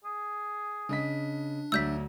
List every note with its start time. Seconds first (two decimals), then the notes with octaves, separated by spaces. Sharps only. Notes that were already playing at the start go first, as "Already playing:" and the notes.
0.04 G#4
0.89 C#3 D4 D#5 B6
1.72 D2 F#3 D5 E5 E6 G6 B6